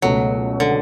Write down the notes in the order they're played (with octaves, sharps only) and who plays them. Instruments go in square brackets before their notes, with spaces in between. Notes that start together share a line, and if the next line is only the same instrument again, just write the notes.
[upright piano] C#2 B2 A3 [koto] F#3
[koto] D3